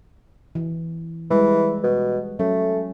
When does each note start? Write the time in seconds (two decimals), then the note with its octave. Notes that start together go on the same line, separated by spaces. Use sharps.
0.55 E3
1.31 E3 G3 G#3
1.84 B2
2.39 F#3 A3 C#4